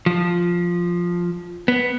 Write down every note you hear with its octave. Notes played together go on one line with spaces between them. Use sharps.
F3
B3